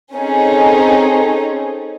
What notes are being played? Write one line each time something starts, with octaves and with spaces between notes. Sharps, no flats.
C4 C#4 D#4 G#4 A4